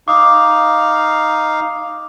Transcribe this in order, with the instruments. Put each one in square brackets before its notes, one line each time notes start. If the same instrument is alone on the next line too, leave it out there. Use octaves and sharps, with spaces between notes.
[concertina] D#4 F5 [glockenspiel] D6 D#6